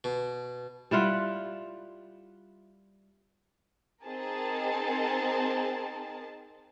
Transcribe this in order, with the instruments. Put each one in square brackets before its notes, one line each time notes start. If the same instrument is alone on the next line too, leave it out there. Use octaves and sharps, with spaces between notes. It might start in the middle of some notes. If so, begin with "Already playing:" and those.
[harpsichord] B2
[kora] G3 E4 F4 F#5
[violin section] C4 D#4 G#4 A#4 A5